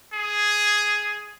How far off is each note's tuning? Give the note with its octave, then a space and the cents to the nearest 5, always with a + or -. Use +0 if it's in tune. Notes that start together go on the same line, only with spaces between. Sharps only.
G#4 +5